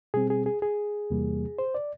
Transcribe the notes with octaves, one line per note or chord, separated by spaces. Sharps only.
B2 G3 C4 G#4
G#4
G#4
G#4
E2 C3 E3 G3 A#3
C5
D5